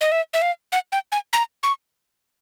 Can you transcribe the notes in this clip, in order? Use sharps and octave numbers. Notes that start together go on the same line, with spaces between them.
D#5
E5
E5
F5
F#5
G5
G#5
A#5
C#6